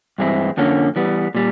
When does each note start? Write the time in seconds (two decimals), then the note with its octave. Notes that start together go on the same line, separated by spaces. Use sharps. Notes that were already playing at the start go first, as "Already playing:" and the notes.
0.18 G2 E3 G#3 C4 E4
0.57 F2 D3 F3 A#3 C#4
0.96 E3 G3 B3
1.35 A#2 G3